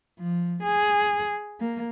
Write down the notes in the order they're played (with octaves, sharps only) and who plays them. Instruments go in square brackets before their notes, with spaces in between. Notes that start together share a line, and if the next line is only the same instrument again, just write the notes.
[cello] F3
G#4
A#3